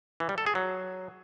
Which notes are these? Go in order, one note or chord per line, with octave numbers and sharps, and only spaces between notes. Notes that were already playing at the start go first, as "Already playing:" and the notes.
E3
G3
A4
G#4
F#3